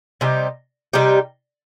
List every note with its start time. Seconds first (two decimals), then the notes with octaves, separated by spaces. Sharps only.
0.21 C3 G3 D#4 G4
0.93 C3 G3 D#4 G4